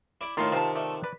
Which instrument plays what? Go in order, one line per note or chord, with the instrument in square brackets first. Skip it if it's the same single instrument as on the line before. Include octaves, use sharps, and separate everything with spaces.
[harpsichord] E4 D5
[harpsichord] A2 A5 [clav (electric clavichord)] D#3 F4 A#4 [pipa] C6
[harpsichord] C3 [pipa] F3 C4 A5
[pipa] A3 D5
[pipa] B4 [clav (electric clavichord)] D5